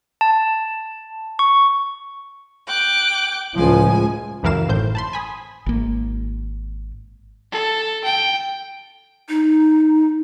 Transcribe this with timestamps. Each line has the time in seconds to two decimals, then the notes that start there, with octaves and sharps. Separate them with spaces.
0.21 A5
1.39 C#6
2.67 G5 D6 F#6
3.59 C#2 A2 F3 G#3 G#5
4.43 C#2 F#2 E3 A#4 F5 E7
4.68 G#1 A2 C5 G6
4.95 A5 B5 C6
5.13 G#5 B5 D#6
5.66 G#1 A#3
7.52 A4
8.04 G5
9.29 D#4